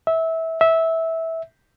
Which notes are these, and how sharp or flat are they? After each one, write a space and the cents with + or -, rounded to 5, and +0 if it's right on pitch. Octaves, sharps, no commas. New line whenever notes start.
E5 -20
E5 -15